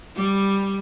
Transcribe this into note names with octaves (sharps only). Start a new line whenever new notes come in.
G3